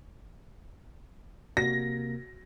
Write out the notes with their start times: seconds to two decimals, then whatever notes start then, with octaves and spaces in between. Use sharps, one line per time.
1.57 C3 A#3 F#4 A#4 A#6